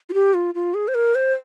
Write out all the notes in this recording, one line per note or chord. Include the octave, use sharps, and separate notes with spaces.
F4
G4
F4
F4
G#4
C5
A#4
C5